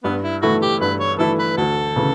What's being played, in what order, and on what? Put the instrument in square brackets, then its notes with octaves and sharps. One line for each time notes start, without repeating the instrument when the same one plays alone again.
[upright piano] G2 [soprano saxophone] B3
[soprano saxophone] E4
[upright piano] E3 A3 E4 [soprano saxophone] F#4
[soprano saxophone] G4
[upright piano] G2 [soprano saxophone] B4
[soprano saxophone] C#5
[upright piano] E3 A3 E4 [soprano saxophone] A4
[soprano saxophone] B4
[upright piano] D2 [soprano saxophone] A4
[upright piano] C#3 E3